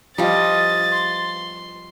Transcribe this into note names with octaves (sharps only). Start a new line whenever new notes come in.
F3 G3 F4 D#5 A6
C6